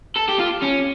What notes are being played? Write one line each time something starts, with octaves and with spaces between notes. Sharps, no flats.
A4
G4
F4
C#4